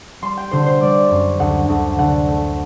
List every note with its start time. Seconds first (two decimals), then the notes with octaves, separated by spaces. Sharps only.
0.22 G3 C6
0.37 G5
0.51 D3 C5
0.66 C5
0.81 G3 D5
1.11 F#2
1.39 D2 F#5
1.69 D2
1.98 D3 F#5
2.28 A3